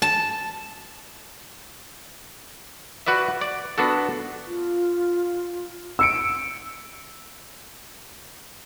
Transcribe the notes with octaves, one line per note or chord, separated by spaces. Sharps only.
A5
F#4 B4 D5 E5
D5
B3 D4 F#4 A4
F4
E6 C#7 D7